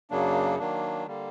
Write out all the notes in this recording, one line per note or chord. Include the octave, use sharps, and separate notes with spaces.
F#2 C#3 F#3 A#3 D4
D#3 F#3 A#3 D4
D3 G3 A#3